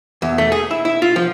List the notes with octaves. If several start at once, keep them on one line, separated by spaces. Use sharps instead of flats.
E2
A3
G#4
E4
E4
F4
F3